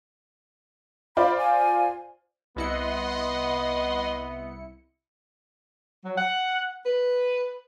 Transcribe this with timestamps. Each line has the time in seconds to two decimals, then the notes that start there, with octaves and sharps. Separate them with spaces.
1.17 F4 C5 D5 B5
1.38 G#5
2.56 C2 B3 E4 D#5 F#5 C6 C#7
6.04 F#3
6.18 F#5
6.86 B4